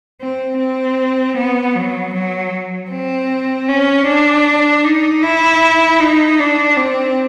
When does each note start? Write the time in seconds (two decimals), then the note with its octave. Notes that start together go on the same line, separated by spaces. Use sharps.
0.21 C4
0.59 C4
1.37 B3
1.75 F#3
2.14 F#3
2.91 C4
3.69 C#4
4.07 D4
4.84 D#4
5.23 E4
6.00 D#4
6.40 D4
6.77 C4